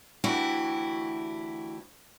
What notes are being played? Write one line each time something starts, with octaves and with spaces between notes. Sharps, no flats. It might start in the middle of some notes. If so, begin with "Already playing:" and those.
D2 E3 E4 F#4 G4